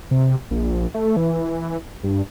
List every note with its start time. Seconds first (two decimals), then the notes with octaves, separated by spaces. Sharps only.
0.11 C3
0.51 A#1
0.94 A3
1.17 E3
2.03 G2